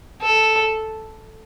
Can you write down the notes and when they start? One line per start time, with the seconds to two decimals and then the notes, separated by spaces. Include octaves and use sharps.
0.22 A4